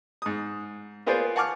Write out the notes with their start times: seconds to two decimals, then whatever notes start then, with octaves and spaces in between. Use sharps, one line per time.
0.22 G#2 D#6
1.06 A#3 B3 F4 G#4 C5 D5
1.36 F#5 G#5 A5 C#6 D6 F6